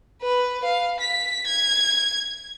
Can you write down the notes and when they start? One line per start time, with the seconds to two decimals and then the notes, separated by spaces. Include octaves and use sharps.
0.22 B4
0.64 F5
1.00 B6
1.47 G#6